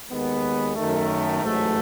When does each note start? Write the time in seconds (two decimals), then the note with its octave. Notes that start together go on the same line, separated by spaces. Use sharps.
0.10 D#2 D#3 G#3 B3
0.76 F#2 D#3 A3
1.42 A1 G#2 F#3 A3